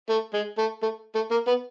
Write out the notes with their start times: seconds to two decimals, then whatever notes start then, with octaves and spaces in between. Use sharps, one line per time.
0.09 A3
0.34 G#3
0.58 A3
0.82 A3
1.15 A3
1.31 A#3
1.47 B3